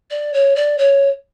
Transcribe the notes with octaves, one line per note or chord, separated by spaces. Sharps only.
D5
C#5
D5
C#5